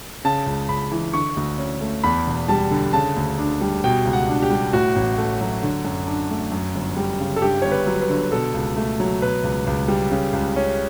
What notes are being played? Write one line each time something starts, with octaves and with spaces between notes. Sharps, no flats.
C#3 A5
C#2
C#2 B5
E3
D3 C#6
D2
C#4
A3
E2 B5
E1
G3 A5
D3
C#3 A5
D2
D4
G3
B2 G5
C#2
F#5
D4
G4
G3
A2 F#4
A1
A3
F#3
D3
F#2
D4
A3
F#2
G1
G3
C#3
A4
G2 G4
G1 C#5
B4
F#3
B4
D3
B2 A4
C#2
A3
F#3
B2 B4
C#2
C#2
G3
C#3
C#2
C#4